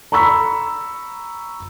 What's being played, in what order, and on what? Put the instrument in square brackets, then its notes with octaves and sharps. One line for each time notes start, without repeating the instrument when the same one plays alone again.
[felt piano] A#5 B5 C#6 E6 B6